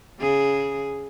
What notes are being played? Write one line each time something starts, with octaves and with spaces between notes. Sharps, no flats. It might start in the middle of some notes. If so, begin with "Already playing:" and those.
C#3 G#4